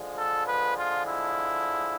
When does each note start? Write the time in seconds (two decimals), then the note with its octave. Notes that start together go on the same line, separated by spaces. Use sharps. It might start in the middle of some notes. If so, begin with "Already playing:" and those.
Already playing: D3 F3 G#3
0.17 A4
0.47 B4
0.77 F4
1.07 E4